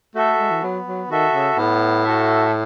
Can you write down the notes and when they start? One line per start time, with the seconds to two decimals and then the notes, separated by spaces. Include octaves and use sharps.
0.15 A3 F#4 A4 E5
0.39 G#3
0.51 E3
0.62 F#3 B3
0.86 F#3
1.09 D#3 F#4 A4 E5
1.33 C#3
1.57 A2 B3
2.04 F#4 A4 E5